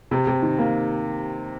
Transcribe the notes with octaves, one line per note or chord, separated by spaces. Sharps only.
C3
C3
D#3
A#3